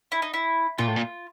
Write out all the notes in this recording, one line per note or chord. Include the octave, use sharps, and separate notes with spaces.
E4
D#4
E4
A#2 F4
A2
A#2